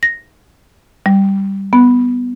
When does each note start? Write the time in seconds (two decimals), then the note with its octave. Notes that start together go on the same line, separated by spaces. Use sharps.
0.03 A#6
1.06 G3
1.73 B3